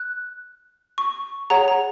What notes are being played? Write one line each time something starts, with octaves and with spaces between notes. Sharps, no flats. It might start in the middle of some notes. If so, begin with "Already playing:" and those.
Already playing: F#6
C#6
G#4 C#5 F#5 A#5
A#5